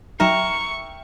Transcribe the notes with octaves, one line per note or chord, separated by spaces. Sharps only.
F#3 D#4 A#4 E5 G5 C#6 D#7 E7